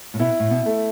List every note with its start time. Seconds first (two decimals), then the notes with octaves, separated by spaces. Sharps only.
0.14 A2
0.19 B2 E4
0.40 A2
0.50 B2
0.66 A3